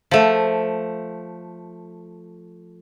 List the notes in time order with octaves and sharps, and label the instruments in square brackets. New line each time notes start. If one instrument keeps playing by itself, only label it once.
[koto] F3 A3